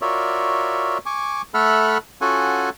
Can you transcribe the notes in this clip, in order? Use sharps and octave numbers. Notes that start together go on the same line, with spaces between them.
F4 F#4 A#4 C#5 D5 E5
G#5 C#6 D6
A3 A4 E5 F#5 B5 F6
C#4 F4 F#4 A4 F#5 G#5